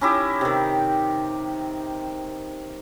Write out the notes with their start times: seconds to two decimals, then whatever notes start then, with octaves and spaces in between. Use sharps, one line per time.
0.01 C#4 D#4 E4 G4
0.41 C3 D#3